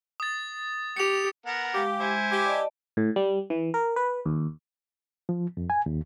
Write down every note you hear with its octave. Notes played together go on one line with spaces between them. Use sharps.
D#6 A6
G4 C#7 F7
B3 A#4 F#5
G#3 G4 F5
G#3 E4 C5 G#5
G4
D5 D#5 A5
A2
G3
E3
A#4
B4
D#2
F3
F2
G#5
D#2